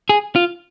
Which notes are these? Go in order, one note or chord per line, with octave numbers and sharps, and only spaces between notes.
G#4
F4